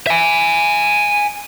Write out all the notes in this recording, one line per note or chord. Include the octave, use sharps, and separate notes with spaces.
E5 G#5